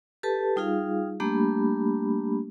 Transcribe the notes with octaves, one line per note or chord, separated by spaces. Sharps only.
G4 A4 B4 A5
G3 D#4 F4 G#4 F5
G3 A3 A#3 D4 G4 B5